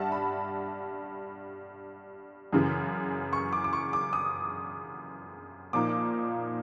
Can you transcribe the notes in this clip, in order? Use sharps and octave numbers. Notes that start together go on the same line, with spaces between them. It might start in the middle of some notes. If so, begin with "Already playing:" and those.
Already playing: G2 E5 F#5 A5
B5
F#2 C#3 E3
C#6
D6
D6
C#6
D6
D#6
A#2 F3 A#3 D#4 D6